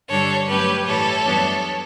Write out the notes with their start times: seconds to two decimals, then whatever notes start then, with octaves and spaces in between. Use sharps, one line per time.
0.09 G2 D3 G3 D4 A4 C#5
0.47 G2 F#3 A3 C#4 G4 B4
0.86 A2 E3 G3 A4 C#5
1.25 F#2 E3 G3 B3 D4